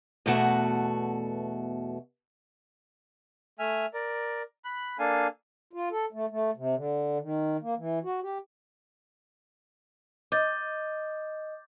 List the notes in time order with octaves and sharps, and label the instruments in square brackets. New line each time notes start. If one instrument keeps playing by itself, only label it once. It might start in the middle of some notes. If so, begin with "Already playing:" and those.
[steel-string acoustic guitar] E2 B2 A3 F#4
[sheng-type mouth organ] A3 E5 G#5 F6
A#4 D5
B5 F#6
A#3 D4 A4 F5 G#5
[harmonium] F4
A4
A3
A3
C3
D3
D#3
A#3
E3
F#4
G4
[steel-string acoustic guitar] D#5 [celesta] D6 G6 A6